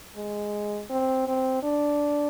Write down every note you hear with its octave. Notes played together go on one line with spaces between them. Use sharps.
G#3
C4
C4
D4